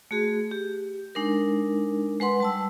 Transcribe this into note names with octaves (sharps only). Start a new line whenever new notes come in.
A3 F#4 G#4
G4
G#3 D4 D#4 A#4
G#3 B4 F#5 C6
G3 A5 E6